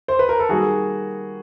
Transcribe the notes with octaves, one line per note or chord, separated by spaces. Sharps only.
C5
B4
A#4
A4
D#3 G3 A#3 F#4 G#4